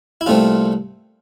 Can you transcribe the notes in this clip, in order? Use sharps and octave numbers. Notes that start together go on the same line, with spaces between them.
E4
C2 A#2 A3 C4 F4